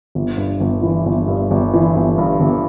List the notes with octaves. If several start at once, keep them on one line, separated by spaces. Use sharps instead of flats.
G1
G2
G1
E3
G1
G2
G1
E3
G1
G2
G1